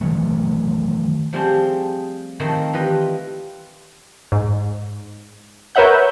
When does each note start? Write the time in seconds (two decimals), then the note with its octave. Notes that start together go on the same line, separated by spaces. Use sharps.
0.01 D#3 E3 F#3 A3
1.33 F3 G3 A3 C4 G#4 C5
2.40 D#3 F3 A3 C4 D#4 C#5
2.73 E3 G3 F4 B4 D#5
4.32 G#2
5.75 A#4 B4 C#5 E5 F#5 G6